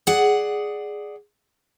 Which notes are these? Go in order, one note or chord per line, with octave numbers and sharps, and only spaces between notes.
G#4 D5 F#5